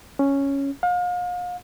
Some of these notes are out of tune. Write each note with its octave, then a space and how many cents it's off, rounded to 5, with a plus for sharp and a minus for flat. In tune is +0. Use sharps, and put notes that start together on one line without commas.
C#4 +0
F5 +40